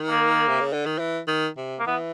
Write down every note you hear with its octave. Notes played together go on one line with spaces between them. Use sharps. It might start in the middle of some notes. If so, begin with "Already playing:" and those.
Already playing: D#3
A#3
C3
C#3
D3
D#3
E3
D#3
C3
A#3
E3 B3